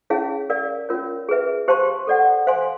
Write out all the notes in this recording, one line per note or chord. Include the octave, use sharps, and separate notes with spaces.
C#4 E4 G#4 C#5 F5
A#4 D5 F5
C#4 F4 A#4 C#5
G#4 B4 E5
G4 C5 F5 A5 C6
A4 D5 F#5
C5 F5 G#5 C6